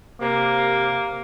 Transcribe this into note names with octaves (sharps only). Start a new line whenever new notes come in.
C3 A#3